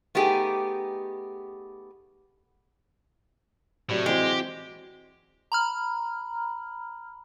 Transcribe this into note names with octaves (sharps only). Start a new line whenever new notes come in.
A3 B3 D#4 G4 G#4
A2 C3 F#3 D5
E3 G#3 C4 F#4 G4
A#5 B5 F6